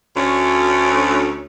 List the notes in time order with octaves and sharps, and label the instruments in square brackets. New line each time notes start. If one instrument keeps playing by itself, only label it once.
[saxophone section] D2 C#4